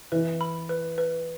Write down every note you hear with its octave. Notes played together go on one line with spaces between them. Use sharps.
E3 B4
B5
B4
B4